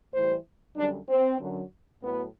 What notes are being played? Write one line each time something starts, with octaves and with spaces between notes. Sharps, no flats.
A2 E3 G3 C5
F#2 D3 G3 D4
C4
F#2 D3 F#3
A2 F#3 B3